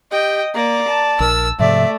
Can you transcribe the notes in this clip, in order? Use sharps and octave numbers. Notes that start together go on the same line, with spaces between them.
G4 D#5 G5
A#3 D5 A#5
A5
A#1 A#4 E6
G#2 C3 F3 A3 D5 E5